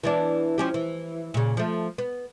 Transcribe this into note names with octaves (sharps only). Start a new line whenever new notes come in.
E3 B3 D4
F3 C#4 G4
E3
A#2 C#3
F3 A3
B3